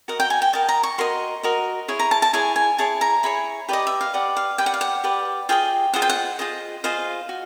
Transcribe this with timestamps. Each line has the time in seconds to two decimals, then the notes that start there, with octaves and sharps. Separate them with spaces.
0.08 F#4 A#4 D#5 F#5
0.20 G5
0.30 G#5
0.42 G5
0.53 F#4 A#4 D#5 A5
0.69 A#5
0.83 C#6
0.98 F#4 A#4 D#5 C6
1.43 F#4 A#4 D#5
1.88 E4 G#4 C#5
1.99 A#5
2.11 A5
2.22 A5
2.33 E4 G#4 C#5 G#5
2.56 G#5
2.78 E4 G#4 C#5 A5
3.01 A#5
3.23 E4 G#4 C#5 B5
3.69 G4 B4 D5 D#5
3.87 E5
4.01 F5
4.13 G4 B4 D5 F#5
4.37 F5
4.58 G4 B4 D5 G5
4.66 F#5
4.74 F5
4.81 F#5
5.04 G4 B4 D5
5.49 F4 G#4 C5 D#5 G5
5.93 F4 G#4 C5 D#5 F#5
6.02 G5
6.09 F#5
6.39 F4 G#4 C5 D#5
6.84 F4 G#4 C5 D#5 F5
7.29 F#4